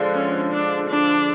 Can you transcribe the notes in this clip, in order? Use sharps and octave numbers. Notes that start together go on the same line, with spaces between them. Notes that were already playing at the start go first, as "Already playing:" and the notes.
Already playing: D3 F3 G#3
C#4
D4
D4